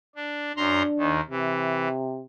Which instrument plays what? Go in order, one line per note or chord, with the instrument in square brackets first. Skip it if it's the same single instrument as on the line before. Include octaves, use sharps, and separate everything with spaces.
[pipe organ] D4
[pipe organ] F#2 A#5 C6 [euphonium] D4
[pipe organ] D#2 D#3
[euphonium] C3 [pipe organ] E3